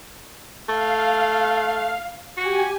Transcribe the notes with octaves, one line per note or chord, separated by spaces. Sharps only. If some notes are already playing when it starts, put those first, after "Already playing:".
A3 F5
F#4 G4 G#5